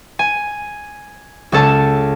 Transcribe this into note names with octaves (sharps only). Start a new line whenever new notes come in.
G#5
C#2 C#4 A4 A5